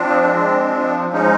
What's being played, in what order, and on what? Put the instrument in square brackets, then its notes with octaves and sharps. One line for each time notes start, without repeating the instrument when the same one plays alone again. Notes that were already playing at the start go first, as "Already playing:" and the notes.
Already playing: [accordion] F3 C4 D4
G#3
F3
G#3 C#4 D#4